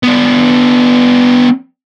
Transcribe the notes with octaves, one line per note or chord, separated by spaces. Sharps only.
B3 D4